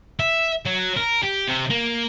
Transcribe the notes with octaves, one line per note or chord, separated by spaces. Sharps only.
E5
F#3
A#4
G4
C3
A#3